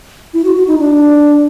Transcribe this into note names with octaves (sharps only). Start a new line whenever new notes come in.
E4
F#4
F#4
D#4
D4